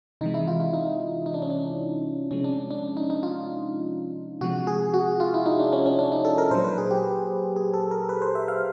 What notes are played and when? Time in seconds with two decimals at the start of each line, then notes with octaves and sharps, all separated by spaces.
0.21 C3 E3 G#3 D#4
0.34 E4
0.48 F4
0.60 E4
0.73 D#4
1.26 D#4
1.34 D4
1.42 C#4
1.50 D4
2.31 C3 F3 G#3 C#4
2.44 D4
2.71 D4
2.97 D#4
3.10 D#4
3.23 F4
4.41 C3 F3 G#3 F#4
4.67 G#4
4.94 F#4
5.20 F4
5.34 E4
5.46 D#4
5.60 D4
5.73 C#4
5.86 C#4
5.99 D4
6.12 D#4
6.25 A4
6.38 A#4
6.51 A#2 F#3 C5
6.64 B4
6.78 G#4
6.91 G4
7.56 G#4
7.74 A4
7.91 A#4
8.09 B4
8.22 C5
8.35 E5
8.48 F5